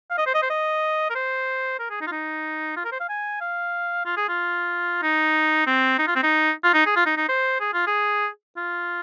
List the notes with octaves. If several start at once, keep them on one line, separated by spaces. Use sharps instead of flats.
F5
D#5
C5
D#5
C5
D#5
A#4
C5
A#4
G#4
D#4
F4
D#4
F4
A#4
C5
F5
G#5
F5
F4
G#4
F4
D#4
C4
D#4
F4
C4
D#4
F4
D#4
G#4
F4
D#4
D#4
C5
G#4
F4
G#4
F4